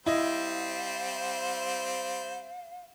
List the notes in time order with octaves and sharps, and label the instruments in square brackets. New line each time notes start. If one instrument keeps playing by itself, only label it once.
[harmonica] G3 C4 C5 [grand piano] E4 D#5 [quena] F5